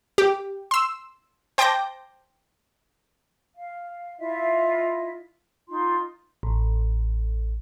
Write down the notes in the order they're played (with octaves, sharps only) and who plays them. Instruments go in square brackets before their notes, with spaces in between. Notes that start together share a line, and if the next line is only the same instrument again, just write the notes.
[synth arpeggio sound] G4
C6 E6
C5 G5 A5 D6 G6 A#6
[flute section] F5
E4 F4 D#5 E5
D#4 F4 C6
[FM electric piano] A1